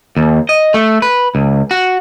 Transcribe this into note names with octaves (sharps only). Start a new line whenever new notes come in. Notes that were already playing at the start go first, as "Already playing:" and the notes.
D#2
D#5
A3
B4
C#2
F#4